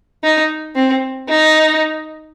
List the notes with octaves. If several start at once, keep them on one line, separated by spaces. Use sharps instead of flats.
D#4
C4
D#4